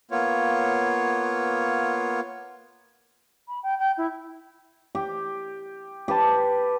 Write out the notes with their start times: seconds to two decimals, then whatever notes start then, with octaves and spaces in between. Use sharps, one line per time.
0.11 A#3 B3 F4 C#5
3.48 B5
3.63 G5
3.78 G5
3.97 E4
4.95 G4
6.08 G4 B4 A5